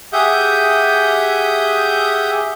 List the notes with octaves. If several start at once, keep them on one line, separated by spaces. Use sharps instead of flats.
G4 G#4 E5 F#5 D#6 G6